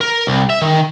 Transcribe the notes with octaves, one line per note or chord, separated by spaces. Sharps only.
A#4
C2
E5
D#3